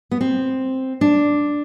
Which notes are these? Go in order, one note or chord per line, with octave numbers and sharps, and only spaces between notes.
B3
C4
D4